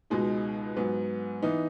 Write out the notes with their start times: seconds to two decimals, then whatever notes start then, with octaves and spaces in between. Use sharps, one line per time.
0.10 C#2 B2 G#3 D#4
0.77 G#2 F#3 B3
1.42 E3 B3 D#4